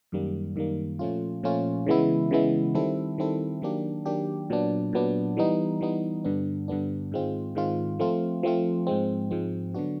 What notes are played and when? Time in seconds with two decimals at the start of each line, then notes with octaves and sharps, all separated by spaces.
0.12 F#2 D#3 G3 A#3
0.56 F#2 D#3 G3 A#3
0.99 A#2 F3 A3 C#4 F4
1.43 A#2 F3 A3 C#4 F4
1.86 C#3 E3 G#3 B3 E4
2.31 C#3 E3 G#3 B3 E4
2.75 D#3 G3 C4 E4 A4
3.18 D#3 G3 C4 E4 A4
3.62 D#3 F#3 A#3 D4 G4
4.06 D#3 F#3 A#3 D4 G4
4.50 A#2 F#3 B3 D4
4.93 A#2 F#3 B3 D4
5.37 E3 G3 B3 D#4
5.81 E3 G3 B3 D#4
6.24 G2 D3 G3 B3 D4
6.68 G2 D3 G3 B3 D4
7.12 G#2 D#3 G#3 C4 F4
7.55 G#2 D#3 G#3 C4 F4
7.99 F3 A3 C4 F4
8.43 F3 A3 C4 F4
8.87 G#2 F3 G#3 C4
9.31 G#2 F3 G#3 C4
9.74 D3 F#3 B3 D4 F#4